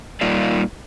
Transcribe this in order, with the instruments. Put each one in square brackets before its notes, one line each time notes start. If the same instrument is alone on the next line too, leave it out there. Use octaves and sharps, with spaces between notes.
[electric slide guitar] G3 A#3 D#4 F4 D5